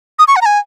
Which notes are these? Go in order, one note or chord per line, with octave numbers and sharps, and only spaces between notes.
D#6
C#6
F#5
A#5
G#5